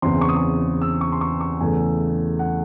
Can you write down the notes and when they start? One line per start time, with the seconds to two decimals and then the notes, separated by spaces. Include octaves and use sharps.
0.02 E2 C#3 E3 C4 C6
0.21 C#6
0.29 D#6
0.36 C#6
0.82 E6
1.01 C#6
1.12 C6
1.21 C#6
1.41 C#6
1.61 E2 C#3 E3 A3 G#5
2.39 F#5